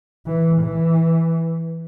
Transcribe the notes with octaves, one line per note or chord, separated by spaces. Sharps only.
E3
E3